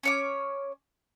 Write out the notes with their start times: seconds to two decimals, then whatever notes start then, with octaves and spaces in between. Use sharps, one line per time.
0.03 C#4 C#5 D6